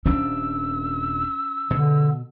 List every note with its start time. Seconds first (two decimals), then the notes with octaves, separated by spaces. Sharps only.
0.06 D#1 C3 C#4 D4 E6
1.70 B2 D3